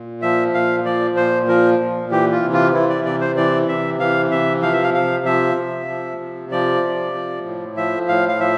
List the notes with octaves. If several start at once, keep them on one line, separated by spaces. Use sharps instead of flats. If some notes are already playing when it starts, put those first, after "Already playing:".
Already playing: A#2
F3 E5
A#2 F5
F3 D5
A#2 C5
F3 A#4
A#2
E3 G4
F4
C3
F4
E3 E4
D5
C3 D5
C5
E3 D5
C3 E5
E3 F5
C3 E5
F3 F5
E5
F5
C3 F5
F3 E5
C3
F3
C3
F3 D5
C3
F3
A2
F3 E5
A2 F5
F5
F3 E5